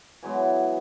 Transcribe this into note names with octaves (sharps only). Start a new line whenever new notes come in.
E3 F#3 G#3 B3